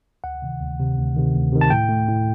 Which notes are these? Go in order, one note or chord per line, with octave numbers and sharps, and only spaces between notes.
D2 F#5
C3 D#3
D2
C3 D#3
D2
C3 D#3
D2
C3 D#3
A5
A2 G5
A3
A2